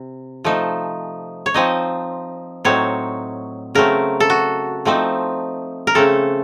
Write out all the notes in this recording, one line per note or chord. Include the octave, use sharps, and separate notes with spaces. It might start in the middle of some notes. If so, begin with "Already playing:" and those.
Already playing: C3
F3 A3 D#4
C#5
F3 C4 D#4 D#5
A2 F#3 C4 D#4 C#5
C#3 F#3 A3 C4 A#4
A4
F#4
F3 A3 C4 D#4
A#4
C#3 A3 C4 A4